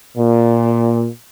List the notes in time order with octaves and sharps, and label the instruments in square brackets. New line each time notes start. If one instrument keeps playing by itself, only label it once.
[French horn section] A#2